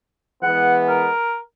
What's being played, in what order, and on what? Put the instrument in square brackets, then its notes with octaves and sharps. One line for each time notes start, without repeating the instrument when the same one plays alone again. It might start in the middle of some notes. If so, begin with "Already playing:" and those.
[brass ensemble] E3 G#3 B3 [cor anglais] F#5
[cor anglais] A#4